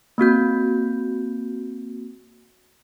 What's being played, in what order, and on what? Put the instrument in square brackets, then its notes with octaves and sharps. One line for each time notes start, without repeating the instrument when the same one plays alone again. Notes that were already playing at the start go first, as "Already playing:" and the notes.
[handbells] A#3 C4 F#4 G6